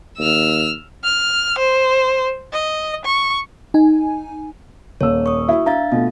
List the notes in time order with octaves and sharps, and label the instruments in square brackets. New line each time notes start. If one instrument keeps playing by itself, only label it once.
[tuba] D#2 [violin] E6 F6
[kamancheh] F6
C5
D#5
C#6
[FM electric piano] D#4 G#5
[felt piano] D#1 A#3 E6 [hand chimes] C#5
[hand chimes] C#6 D#6
[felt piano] E4 F#4 E5
[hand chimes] D4 F5 A6 [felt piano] E5 A#5
[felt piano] B2 A3 [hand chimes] F4 D#5